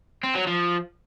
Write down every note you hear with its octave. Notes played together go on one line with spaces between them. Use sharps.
C4
F#3
F3